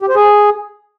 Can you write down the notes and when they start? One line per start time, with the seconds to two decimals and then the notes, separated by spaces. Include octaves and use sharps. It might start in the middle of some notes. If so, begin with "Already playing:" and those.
0.02 G4
0.09 C5
0.15 G#4